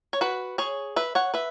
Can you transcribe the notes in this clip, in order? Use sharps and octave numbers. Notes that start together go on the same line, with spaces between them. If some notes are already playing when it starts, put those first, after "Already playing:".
C#5
F#4 B4
G#4 C#5
B4 E5
C#5 F#5
B4 E5